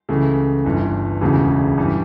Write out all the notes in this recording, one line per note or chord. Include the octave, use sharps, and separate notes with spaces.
C#2 C#3 E3 A3
G1 G2 E3
E1 D2 C#3 E3
G2 E3 G3